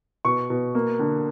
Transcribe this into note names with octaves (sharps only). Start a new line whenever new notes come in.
B2 C#6
B2
A#3
D3